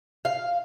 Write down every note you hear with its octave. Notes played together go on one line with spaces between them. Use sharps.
F5